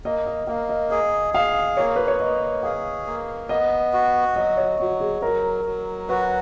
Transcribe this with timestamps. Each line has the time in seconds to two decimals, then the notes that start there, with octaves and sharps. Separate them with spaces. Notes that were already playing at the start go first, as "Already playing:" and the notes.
0.05 A#3 D#5
0.26 D#5
0.47 A#3 F5
0.69 D#5
0.90 G#4 D#5
1.34 G#4 F5
1.77 A#3 C#5
1.96 B4
2.08 C#5
2.20 A#3 D#5
2.63 G#4 F5
3.06 A#3
3.49 B3 D#5
3.93 F#4
4.36 F#3 D#5
4.57 C#5
4.79 F#3 F#4
5.01 G#4
5.22 F#3 A#4
5.65 F#3
6.09 F#4 B4